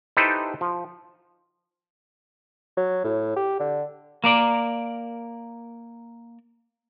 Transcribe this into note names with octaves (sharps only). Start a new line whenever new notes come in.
D#4 E4 G4 A4 B4 C5
F3
F#3
A2
G4
D3
A#3 A#4 D5